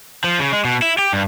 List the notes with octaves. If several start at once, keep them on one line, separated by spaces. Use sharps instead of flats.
F3
C#3
G#3
B2
E4
G4
G2